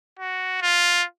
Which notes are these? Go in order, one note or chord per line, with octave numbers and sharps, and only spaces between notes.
F#4
F4